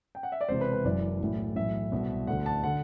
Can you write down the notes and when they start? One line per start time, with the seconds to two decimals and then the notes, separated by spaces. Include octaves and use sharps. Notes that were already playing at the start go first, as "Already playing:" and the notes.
0.15 G5
0.23 F#5
0.32 E5
0.41 D5
0.48 E1 E2 C3 E3 C5
0.61 B4
0.73 B4
0.85 F#1 F#2 E3 D5
1.21 B1 A2 E3
1.56 B1 A2 E3 E5
1.92 C2 B2
2.27 D2 D3 F#5
2.46 A5
2.63 D3 F#5